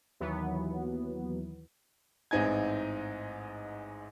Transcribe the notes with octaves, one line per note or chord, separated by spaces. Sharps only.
D#2 E3 F#3 B3
A1 G#2 C4 D#4 G#5 G#6